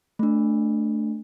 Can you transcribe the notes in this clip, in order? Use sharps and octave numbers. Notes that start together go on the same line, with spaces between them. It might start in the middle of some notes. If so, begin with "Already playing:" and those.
A3 D4